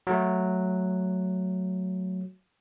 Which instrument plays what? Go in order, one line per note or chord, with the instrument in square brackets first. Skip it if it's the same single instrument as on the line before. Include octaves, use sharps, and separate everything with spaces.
[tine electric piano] F#3 A3